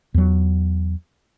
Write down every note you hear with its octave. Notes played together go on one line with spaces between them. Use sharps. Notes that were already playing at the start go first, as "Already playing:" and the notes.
E2 F#3